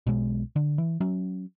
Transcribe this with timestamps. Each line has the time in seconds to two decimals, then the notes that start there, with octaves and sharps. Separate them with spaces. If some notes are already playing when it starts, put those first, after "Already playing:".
0.07 B1 B2 G#3
0.56 D3
0.78 E3
1.01 F#3 C#4